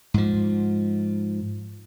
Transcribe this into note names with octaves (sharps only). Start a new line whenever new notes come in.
G#2 F3